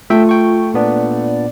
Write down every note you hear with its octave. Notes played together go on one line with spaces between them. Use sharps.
A3 F4 A4 E5 G5
G5 C#6
A#2 B3 D4 D5